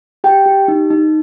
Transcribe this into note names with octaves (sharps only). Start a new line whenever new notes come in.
G4 G5
G4
D#4
D#4